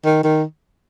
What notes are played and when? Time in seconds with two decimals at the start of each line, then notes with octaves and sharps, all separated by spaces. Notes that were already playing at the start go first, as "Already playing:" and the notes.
0.04 D#3
0.24 D#3